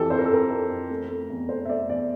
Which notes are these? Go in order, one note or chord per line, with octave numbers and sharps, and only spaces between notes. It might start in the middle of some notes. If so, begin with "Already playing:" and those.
Already playing: F2 E3 G4 A4
F2 C5
A#4
A4
F2 A#4
F2
F2
A3
A3
E2
A3 C5
E5
A3 D5
E2 D5